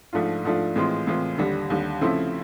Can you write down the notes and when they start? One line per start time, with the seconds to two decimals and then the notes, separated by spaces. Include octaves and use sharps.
0.13 G#2 F3 A3 D4 F4
0.44 G#2 F3 A3 D4 F4
0.76 A2 E3 G#3 C4 F4
1.07 A2 E3 G#3 C4 F4
1.38 D#2 D3 G3
1.70 D#2 D3 G3
2.01 C#3 F3 A3 C4 E4